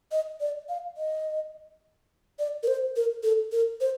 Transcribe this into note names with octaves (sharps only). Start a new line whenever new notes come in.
D#5
D5
F5
D#5
D5
A#4
C5
A#4
A4
A#4
C5